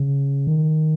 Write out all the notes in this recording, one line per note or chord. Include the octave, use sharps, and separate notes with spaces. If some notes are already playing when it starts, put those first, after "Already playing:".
Already playing: C#3
D#3